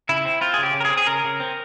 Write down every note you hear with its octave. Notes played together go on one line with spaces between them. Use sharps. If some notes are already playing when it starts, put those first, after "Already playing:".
C#3 E4
C4
C4 F4
G#4
C#3 G4
C#3
A#4
G#4
C4
G#4
C#3 A#4
C#3
C4